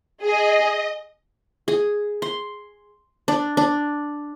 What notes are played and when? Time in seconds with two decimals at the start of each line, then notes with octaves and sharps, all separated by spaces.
0.23 G#4 D#5
1.68 G#4
2.22 C6
3.28 D4
3.57 D4